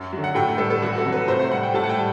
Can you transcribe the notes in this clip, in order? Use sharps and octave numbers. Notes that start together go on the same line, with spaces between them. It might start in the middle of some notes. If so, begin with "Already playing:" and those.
Already playing: F#2
D3 F#3
F#5
A2 G5
G3 A4
A4
C2 F#4
A4
C3 F#3
B4
A2 C5
C5
G3 F#5
G5
A2 A5
F#5
G5
G3